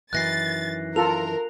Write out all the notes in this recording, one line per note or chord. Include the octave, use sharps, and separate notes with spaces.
F#2 D#3 E3 F#6 A6 A#6 C7
F4 A4 A#4 F7